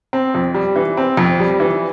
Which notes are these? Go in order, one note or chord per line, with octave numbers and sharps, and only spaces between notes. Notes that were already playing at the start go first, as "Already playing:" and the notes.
C4
F2
G3
E3
C4
F2
G3
E3